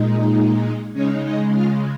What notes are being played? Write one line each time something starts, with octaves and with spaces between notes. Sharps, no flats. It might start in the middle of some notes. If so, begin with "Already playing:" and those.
Already playing: A#2 G#3 D#4
C#3 G#3 C#4 D#4 C#5
D#4 D#5
F4 F5